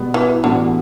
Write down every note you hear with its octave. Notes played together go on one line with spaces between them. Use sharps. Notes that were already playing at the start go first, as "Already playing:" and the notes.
Already playing: B2 G3 B3
E3
A2 D3 E3 G3 B3 F#4